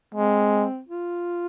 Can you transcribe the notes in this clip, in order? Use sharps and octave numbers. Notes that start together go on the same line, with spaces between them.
G#3 C4
F4